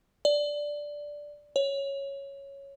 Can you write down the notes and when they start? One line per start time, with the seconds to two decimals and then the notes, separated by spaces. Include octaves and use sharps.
0.25 D5
1.56 C#5